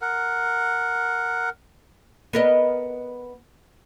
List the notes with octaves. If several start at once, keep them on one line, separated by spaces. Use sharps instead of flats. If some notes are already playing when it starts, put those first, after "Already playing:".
A#4 F#5
B3 A#4 D#5